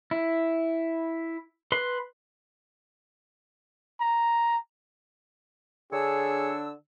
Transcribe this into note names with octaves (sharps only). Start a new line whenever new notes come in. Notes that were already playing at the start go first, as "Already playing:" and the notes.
E4
B4 C6
A#5
D3 D4 G#4 C#5 E6